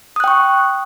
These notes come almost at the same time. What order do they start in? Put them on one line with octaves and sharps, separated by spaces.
D#6 F#6 G5 C#6